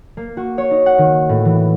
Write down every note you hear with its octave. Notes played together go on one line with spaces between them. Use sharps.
A#3
F#4
C#5
D#4
F#5
D#3
A2
E3